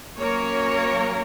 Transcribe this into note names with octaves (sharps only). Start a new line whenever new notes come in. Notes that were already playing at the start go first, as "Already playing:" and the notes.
F#3 A#3 C#4 A#4 C#5